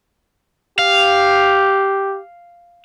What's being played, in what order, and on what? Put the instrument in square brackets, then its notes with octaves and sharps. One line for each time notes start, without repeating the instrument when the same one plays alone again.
[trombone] G4 [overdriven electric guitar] F5